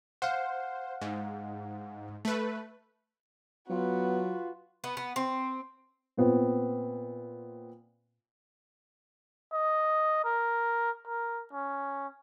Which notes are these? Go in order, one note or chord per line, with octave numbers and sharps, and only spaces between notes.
C5 F5 F#5
G#2
A3 B4
F#3 B3 F4 F#4 B4
B3
B3
C4
A#2 B3 C4
D#5
A#4
A#4
C#4